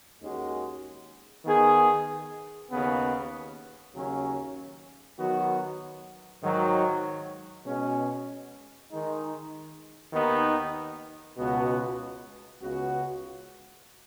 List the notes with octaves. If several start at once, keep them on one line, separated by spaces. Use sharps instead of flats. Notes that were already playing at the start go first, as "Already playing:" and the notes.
D#2 D#3 G#3 C#4 F#4
D#3 B3 G#4
D#2 C#3 B3
D#2 C#3 F#3 C#4
D#3 F#3 B3 F#4
G#2 D#3 F#3
B2 G#3 C#4 G#4
D#3 G#3 D#4
D#2 D#3 B3 D#4
C#2 B2 B3 F#4
C#2 C#3 B3 F#4